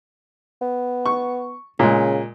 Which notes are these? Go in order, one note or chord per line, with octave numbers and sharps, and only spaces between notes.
B3
C#6
A#2 C#3 G#3